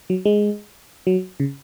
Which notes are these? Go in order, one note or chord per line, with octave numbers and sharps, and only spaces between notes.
F#3
G#3
F#3
C#3